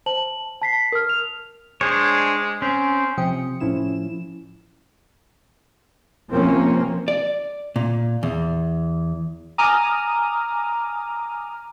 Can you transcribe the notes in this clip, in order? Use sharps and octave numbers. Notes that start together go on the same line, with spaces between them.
C5 A5 F#7
A5 B6 C7
A#4 F6
F7
G#3 D4 C5 C#5
C4 C#4
C3 F3 C4 G5 D#6 C#7
A2 F3 C#4 E4 E7
C3 F3 A#3 C4 C#4
D5
A#2
E2
G#5 A#5 D6 D#6 F6 D#7